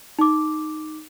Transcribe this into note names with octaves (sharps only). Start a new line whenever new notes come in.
D#4 D6